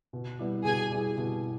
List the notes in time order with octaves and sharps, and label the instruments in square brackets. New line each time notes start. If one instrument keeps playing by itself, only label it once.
[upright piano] B2
G3 B3 E4 G4
[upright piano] B2 [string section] G#4 G#5
[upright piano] G3 B3 E4 G4
B2